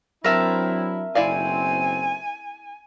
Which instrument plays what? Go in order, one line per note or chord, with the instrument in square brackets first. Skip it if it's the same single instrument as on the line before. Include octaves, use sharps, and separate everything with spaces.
[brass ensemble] F#3 D4 E4 [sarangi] C4 [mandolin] A#4 E5 A5
[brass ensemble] F#1 B1 C4 [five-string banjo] E4 D5 F5 [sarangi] G#5